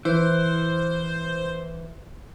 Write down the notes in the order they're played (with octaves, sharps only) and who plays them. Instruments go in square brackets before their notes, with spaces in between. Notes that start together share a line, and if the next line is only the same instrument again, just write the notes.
[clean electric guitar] E3 [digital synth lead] C5